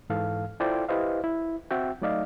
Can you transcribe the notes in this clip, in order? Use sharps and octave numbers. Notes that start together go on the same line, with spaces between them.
G#2 E3 A4 F5
E4 F4 A4 C5 D5 G5
E4 G4 B4 C5 D#5 F5
E4
C4 F#4 E5 G5
F#3 A3 D#4 D5 D#5 F5